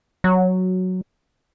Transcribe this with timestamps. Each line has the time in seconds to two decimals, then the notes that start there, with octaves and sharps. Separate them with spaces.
0.24 F#3